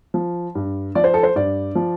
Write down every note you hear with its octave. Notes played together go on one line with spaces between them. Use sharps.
F3
G2
F3 D5
C5
A4
C5
G2 D5
F3